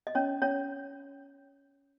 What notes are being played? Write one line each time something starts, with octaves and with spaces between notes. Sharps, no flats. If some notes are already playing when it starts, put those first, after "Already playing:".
D#5
C#4 C#5
C#4 C#5